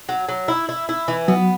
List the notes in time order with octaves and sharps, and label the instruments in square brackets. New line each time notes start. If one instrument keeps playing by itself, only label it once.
[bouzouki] F#3
F#3
E4
E4
E4
E3
[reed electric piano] F#3 [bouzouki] B3